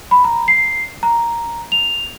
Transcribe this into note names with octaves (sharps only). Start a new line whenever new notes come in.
B5
A#5
C7
A#5
F7